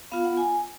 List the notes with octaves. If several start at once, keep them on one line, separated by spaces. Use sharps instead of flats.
B3 F4 F5
F#5
G#5